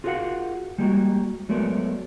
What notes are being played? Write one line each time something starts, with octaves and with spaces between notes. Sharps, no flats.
F4 F#4 G#4 A#4 F5 F#5
G3 G#3 A#3 F#4
F#3 G#3 A3 B3 A#4 D5